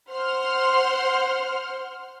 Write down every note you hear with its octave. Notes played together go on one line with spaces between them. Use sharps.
C5 F#5 C6 F6